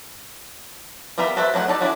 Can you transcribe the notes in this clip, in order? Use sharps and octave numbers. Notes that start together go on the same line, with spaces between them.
G3 B3 F4 A#4 E5
F#4 A4 B4 C5 E5
F#3 A3 G#4 F#5
D#4 A4 D5
C#4 D4 E4 F#4